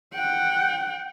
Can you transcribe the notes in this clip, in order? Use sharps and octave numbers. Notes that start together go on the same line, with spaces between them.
F#5 G5